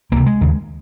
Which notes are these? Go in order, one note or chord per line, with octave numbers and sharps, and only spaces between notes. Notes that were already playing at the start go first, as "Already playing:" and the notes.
C#2 C3 A#3
G#3
D#2 C#3